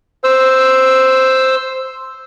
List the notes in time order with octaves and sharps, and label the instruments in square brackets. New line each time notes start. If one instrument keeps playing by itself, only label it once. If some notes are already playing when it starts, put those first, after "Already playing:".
[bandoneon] C5 E6